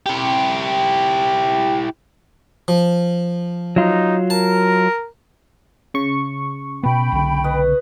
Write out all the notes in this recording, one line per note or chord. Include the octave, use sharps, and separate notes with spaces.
E4 G4
F3
F#3 D#4 F4
A#4 A5
C#3 C#6
B2 B3 G5 B5
B1 D3
B4 D#5